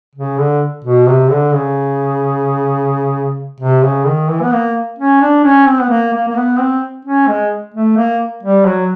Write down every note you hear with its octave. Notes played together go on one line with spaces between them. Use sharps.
C#3
D3
B2
C3
D3
C#3
C3
C#3
D#3
E3
B3
A#3
C#4
D4
C#4
C4
B3
A#3
A#3
A#3
B3
C4
C#4
G#3
A3
A#3
G3
F#3